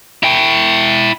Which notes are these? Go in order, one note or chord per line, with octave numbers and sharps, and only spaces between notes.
E4 G5